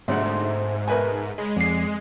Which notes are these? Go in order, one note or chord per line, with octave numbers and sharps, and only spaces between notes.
D2 G#2 C3 G#3 A3 C4 F#5
B2 A3 A#4 B4 G#5
C#3 G#3
F2 D5 C7